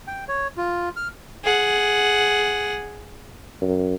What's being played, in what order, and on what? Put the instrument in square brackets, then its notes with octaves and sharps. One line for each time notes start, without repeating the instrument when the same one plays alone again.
[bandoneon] G5
C#5
F4
F6
[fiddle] G#4 F#5
[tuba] F#2